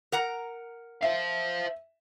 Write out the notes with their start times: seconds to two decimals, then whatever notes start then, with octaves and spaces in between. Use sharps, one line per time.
0.12 A#4 F#5 A#5
1.03 C5 E5 F5